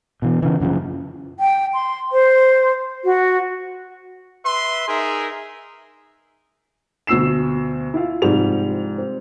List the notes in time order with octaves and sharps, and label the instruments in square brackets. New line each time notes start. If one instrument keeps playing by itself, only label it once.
[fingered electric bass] B2 E3
C#3 E3
F#2 C#3 E3 F3
[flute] G5
C6
C5
F#4
[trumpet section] B4 E5 C6
D#4 G#4 A#4 E5
[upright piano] D2 B2 E6 C7 E7
E4 F4 F5
G#2 C3 F3 G3 F7
C4